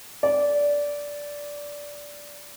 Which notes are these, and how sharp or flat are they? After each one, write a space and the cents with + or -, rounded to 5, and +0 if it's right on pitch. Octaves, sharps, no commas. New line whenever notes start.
D5 -15